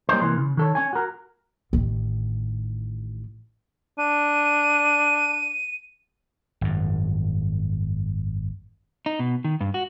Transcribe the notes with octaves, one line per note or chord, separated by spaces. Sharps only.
G3 A#3 C#4 D#4 C5
C2 E3 A#3 C6
C#3
D#3 A4 C#5
C#4 C#5 G#5
F#4 A#4
A1 D#3
D4 D#7
G#1 F#2
D#4
B2
D#3
G2
F#4